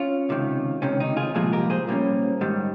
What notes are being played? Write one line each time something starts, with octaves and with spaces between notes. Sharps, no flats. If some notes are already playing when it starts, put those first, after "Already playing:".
Already playing: C#4 F4
C#2 C3 D#3
C#2 C3 D#3 C#4
D#4
F4 G#4
C2 A#2 F3 G#3 F4 G#4
G4 A#4
G#4 C5
A#2 G3 A#3 C#4
G#2 D#3 G3